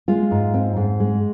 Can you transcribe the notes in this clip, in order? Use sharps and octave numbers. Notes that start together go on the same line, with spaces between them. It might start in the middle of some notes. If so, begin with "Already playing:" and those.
G#3 F4
G#2
C4
G#2
G#3